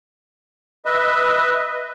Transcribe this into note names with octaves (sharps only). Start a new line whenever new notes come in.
B4 D#5 E5